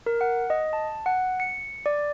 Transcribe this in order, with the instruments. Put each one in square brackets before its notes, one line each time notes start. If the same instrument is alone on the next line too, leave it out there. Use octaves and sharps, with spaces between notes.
[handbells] A#4
F#5
D#5
A5
F#5
C#7
D5